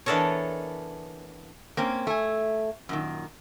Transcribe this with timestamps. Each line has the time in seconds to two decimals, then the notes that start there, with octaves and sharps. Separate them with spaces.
0.06 E3 B3 D4 A4 A#4 C#5
1.77 A#3 C4 C#4
2.07 A3 G#5
2.89 F#2 A#2 D#3